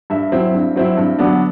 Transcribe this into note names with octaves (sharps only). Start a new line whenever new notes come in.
G2 E5
F#3 C4 E4
G2
F#3 C4 E4
G2
D3 F#3 B3 D4